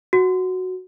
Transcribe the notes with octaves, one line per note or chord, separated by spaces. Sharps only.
F#4